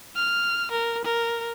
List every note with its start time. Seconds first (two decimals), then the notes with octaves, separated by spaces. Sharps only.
0.16 F6
0.72 A#4
1.05 A#4